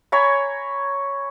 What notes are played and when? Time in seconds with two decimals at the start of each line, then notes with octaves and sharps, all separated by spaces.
0.12 C#5 G#5 A#5 B5